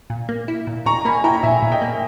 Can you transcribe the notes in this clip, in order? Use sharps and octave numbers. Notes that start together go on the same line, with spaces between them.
A#2
A#3
E4
A#2
A#2 A#5 C#6
A#3 G#5 B5
E4 G5 A#5
A#2 E5 G#5
A#2
D#5 G5
A#3